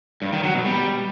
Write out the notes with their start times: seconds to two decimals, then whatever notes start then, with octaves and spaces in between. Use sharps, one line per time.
0.22 G2
0.33 D#3
0.43 F#3
0.54 B2
0.65 G3